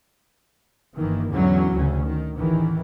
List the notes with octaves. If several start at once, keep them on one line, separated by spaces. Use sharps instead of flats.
G1 D#3 E3 A#3
E2 G#2 D3 E3 F#3 C#4
D2 C#3 C#4
D#3
A1 E2 D#3 E3